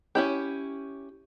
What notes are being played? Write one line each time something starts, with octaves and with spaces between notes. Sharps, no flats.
C#4 E4 G4